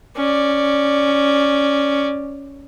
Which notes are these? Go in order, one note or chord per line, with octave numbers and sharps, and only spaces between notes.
C#4 D5